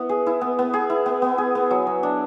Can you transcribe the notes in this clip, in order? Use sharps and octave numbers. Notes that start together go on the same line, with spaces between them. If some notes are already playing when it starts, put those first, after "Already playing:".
Already playing: B3 E4
G#4
E4
B3
B3
G#4
E4
B3
B3
G#4
B3
F#3
F#3
D4